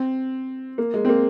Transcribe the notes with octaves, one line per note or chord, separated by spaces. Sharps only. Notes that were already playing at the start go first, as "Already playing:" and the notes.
Already playing: C4
A#3
G#3
C4
A#3